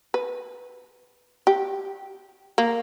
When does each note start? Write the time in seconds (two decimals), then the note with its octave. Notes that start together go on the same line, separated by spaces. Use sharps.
0.14 B4
1.47 G4
2.58 A#3